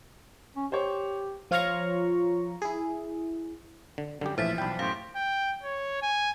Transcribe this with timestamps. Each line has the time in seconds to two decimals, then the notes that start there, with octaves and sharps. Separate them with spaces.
0.56 C#4
0.72 G4 C5 C#5
1.51 F3 F4 C#5 F5 A#5 C#6
2.62 E4 G#4
3.98 D3
4.21 F#2 D3 G3 G4
4.38 A#1 A2 E3 F3 C5 E5 A6 B6
4.58 B1 D4 D5 G5 B5
4.79 F#2 A2 G4 C5 F5 C6
5.16 G5
5.63 C#5
6.02 G#5